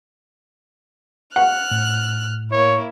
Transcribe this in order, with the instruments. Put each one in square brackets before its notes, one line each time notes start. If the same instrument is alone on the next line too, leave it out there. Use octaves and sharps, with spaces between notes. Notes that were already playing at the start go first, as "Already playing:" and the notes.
[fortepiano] F#5 [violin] F6 F#6
[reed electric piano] A2
[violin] A#3 E4 [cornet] C#5